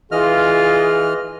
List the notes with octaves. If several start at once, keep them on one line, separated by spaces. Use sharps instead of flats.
E3 F4 G#4 D#5 F6